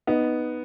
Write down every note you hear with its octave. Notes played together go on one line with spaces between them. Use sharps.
B3 D#4